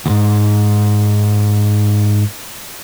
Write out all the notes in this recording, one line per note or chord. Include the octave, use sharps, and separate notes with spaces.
D2 G#2